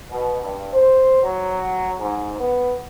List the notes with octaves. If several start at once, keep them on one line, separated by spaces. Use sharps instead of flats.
B2
G2
C5
F#3
G#2
B3